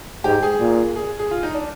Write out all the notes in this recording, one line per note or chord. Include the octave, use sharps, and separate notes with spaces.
G#2 G4
G#4
A#2
G#4
G#4
F4
D#4
D4